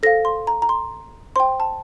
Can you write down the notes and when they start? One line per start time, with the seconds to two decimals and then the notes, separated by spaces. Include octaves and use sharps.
0.03 A4 C5 F5 A#6
0.25 C6
0.47 A#5
0.62 A#5
0.69 C6
1.36 C5 G5 C6
1.60 A5